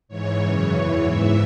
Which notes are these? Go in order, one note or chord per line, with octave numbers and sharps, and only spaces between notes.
G#2 E3 C#5
F#2 C#3 E3 C#5
E2 E3
G#2 E3 E5